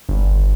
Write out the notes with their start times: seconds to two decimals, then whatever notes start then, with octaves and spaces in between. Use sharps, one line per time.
0.09 G1